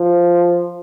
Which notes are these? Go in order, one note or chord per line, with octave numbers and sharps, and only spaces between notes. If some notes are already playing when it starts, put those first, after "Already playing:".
Already playing: F3